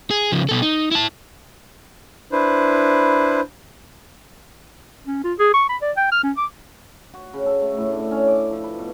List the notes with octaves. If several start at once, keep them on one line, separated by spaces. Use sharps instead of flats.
G#4
C#3 F3
B2 A4
D#4
E4 A5
D4 E4 B4 C5
C#4
F4
G#4
C#6
B5
D5
G5
F6
C#4
D6
F#4
C#3
A4
A3
A2
D4
C#4
D6
F3
B4
B2